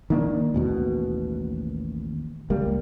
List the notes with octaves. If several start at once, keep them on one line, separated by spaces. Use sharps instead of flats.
D#3 A#3 D4
A1 D#2 B2
C#2 G3 A#3